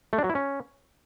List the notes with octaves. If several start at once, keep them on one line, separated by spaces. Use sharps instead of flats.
A3
D4
F#3
E4
C#4